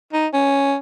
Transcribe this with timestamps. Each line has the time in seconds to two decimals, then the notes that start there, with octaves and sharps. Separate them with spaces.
0.13 D#4
0.33 C#4